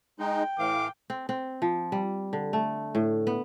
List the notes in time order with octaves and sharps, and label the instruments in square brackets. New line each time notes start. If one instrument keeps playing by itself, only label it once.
[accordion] G#3 D#4 [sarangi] G5
[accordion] A2 E3 F5 [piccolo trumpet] D6
[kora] C4
C4
F3
G3
D3
A3
A2
B3